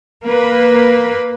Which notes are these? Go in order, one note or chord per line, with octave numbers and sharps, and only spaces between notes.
A#3 B4